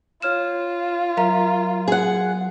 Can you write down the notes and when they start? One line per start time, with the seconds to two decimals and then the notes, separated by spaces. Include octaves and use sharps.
0.22 F4 C#5 F6 E7
1.17 F#3 A#4 E5 A#5
1.88 G#4 F#5